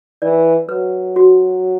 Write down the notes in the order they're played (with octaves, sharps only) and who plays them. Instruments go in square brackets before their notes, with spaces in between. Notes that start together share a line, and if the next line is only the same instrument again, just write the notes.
[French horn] E3 [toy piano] D5
[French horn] F#3 [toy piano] B4
[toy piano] F#4